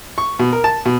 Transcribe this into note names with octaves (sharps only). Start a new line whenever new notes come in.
C#6
B2
A#4
A5
B2